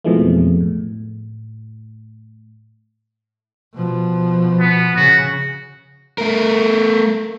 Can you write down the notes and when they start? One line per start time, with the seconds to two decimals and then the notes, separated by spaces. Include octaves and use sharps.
0.04 F2 B2 E3 F3 G#3 A3
0.61 A2
3.74 B2 F3
4.60 B3
4.96 C#3 F#4
6.18 A3 A#4